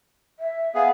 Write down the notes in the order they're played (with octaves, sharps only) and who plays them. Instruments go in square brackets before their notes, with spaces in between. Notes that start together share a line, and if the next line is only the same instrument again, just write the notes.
[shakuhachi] E5
[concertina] B3 G#4 [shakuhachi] F5